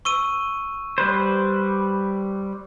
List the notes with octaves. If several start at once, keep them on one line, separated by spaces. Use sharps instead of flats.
C#6 E6 D#7
G3 B4 C5